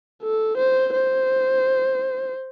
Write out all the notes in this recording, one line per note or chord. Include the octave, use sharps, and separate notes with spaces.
A4
C5
C5